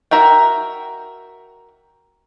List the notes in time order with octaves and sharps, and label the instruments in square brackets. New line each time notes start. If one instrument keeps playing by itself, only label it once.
[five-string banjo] F#4 A#4 E5 G5